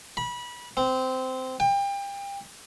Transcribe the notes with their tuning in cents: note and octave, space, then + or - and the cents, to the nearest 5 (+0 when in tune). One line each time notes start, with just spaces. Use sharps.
B5 -25
C4 -15
G5 +30